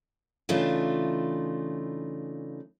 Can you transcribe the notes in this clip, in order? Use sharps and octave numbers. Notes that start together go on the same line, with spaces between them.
C#3 E3 A3 D4 D#4 F4